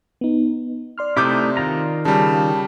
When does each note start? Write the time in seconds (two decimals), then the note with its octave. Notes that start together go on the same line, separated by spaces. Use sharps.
0.21 B3 D#4
0.98 D5 C6 F6
1.17 C3 A3 D#4 E4 D6 G6
1.57 D#3 F4 A#5
2.05 C#3 G3 A5